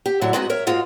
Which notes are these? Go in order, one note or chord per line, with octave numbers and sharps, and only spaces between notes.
G4
A2 D3 F#3 E4
G#3 B3 C4 D#4 F#4
A#4 C#5 E5
G#2 G#3 F4 F#4